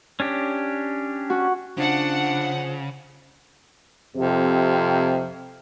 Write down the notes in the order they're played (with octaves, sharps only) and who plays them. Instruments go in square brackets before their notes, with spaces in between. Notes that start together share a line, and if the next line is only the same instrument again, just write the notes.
[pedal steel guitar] C#4 D4 G4
[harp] F#4
[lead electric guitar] C#3 [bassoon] F3 [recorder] D4 [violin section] F#5
[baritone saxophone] F2 [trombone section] C3